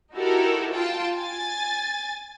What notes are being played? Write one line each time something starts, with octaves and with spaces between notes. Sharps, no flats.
D#4 E4 F#4 G4 A4 A#4
F4 G5 A5
G#5 A6